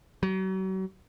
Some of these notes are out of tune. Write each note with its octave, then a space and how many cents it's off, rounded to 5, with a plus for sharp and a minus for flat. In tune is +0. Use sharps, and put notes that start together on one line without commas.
F#3 +40